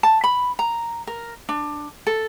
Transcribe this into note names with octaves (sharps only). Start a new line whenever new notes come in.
A5
B5
A#5
A#4
D4
A4